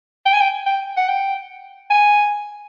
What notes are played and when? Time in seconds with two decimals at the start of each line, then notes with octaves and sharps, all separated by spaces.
0.26 G5
0.33 G#5
0.41 G5
0.67 G5
0.97 F#5
1.08 G5
1.90 G#5